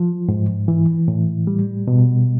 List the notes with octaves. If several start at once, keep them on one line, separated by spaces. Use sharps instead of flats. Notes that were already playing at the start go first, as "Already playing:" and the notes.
Already playing: F3
G#2
E3
A2
G3
B2